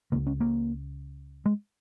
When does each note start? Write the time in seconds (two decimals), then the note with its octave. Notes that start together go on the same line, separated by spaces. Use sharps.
0.12 C#2 C#3 A#3
0.27 C#4
0.40 A#3
1.46 G#3